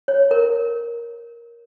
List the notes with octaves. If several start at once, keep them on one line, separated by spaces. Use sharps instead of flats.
C#5
A#4